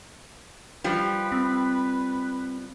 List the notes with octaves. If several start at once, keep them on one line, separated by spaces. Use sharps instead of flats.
F3 G3 B4
C4